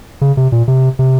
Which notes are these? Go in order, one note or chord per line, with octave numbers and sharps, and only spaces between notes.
C#3
C3
A#2
C3
C3